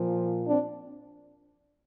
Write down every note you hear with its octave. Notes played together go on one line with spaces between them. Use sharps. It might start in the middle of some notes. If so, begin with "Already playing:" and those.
Already playing: A#2 F3
C4 D4